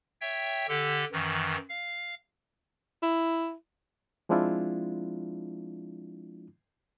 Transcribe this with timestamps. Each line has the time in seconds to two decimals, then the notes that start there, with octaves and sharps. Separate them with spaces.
0.21 C#5 E5 G5
0.68 D3 G4 A4
1.12 F#2 D#3 E3
1.69 F5
3.03 E4
4.29 F3 G#3 C4 D4 E4 F4